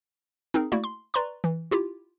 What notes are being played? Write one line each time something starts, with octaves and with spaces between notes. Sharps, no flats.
C4 D#4 G#4 A#4
A3 A#3 E4 F#4 D5
C6
B4 D5 A#5 C6 C#6
E3
E4 F4 G4